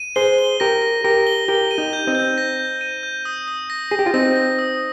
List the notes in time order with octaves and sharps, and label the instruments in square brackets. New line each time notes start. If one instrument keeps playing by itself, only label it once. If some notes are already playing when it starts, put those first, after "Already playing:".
Already playing: [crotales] D#7
[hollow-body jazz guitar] G#4 C5 [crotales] G7
[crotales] G7
[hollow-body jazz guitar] G4 A#4 [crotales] A#6
[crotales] A#6
[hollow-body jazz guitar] G4 A#4 [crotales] A#6
[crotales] G7
[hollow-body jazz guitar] G4 A#4 [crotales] G7
[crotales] D#7
[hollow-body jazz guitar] D#4 G4
[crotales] G6
[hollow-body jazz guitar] C4 D#4
[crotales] G6
A#6
G6
D#7
G6
D#6
D#6
A#6
[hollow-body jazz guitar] G#4 [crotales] A#6
[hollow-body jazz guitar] G4
F4
[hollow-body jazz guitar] C4 D#4 [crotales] A#6
[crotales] A#6
D#6